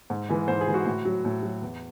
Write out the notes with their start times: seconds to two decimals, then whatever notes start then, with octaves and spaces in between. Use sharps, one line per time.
0.10 G#2
0.29 E3 G#3
0.48 G#2 C5
0.61 G#4
0.68 E3 G#3
0.74 F#4
0.86 A2
1.05 F#3
1.25 A2
1.43 F#3
1.62 E2